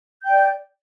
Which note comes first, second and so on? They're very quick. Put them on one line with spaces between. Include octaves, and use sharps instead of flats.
G6 G5 D5